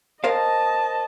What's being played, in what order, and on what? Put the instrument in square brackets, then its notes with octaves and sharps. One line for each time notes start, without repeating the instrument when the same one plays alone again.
[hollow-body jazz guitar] A#4 C5 F5 [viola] D#5 A5